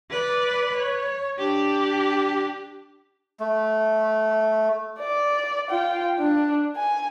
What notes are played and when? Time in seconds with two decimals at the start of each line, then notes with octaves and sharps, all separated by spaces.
0.10 B4 D5
0.75 C#5
1.39 D4 G4
3.40 A3
4.99 D5
5.69 F4 G5
6.19 D4
6.76 G#5